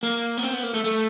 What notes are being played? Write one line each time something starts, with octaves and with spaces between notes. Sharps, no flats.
A#3
B3
C4
B3
A#3
A3
A3